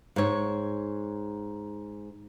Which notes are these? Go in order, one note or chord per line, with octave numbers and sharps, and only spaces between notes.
G#2 C#5